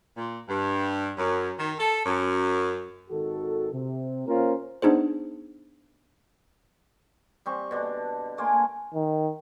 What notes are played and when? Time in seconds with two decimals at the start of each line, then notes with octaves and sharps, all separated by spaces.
0.17 A#2
0.49 G2
1.17 F#2
1.59 D#3
1.79 A4
2.05 F#2
3.10 G#1 D#3 F#4 A4
3.73 C3
4.28 A#3 C#4 F4 A#4 C5
4.82 B3 D4 D#4 G#4 C5
7.46 G3 C4 C#6
7.71 B2 D3 D4
8.37 A3 A#3 G#5 C6
8.95 D#3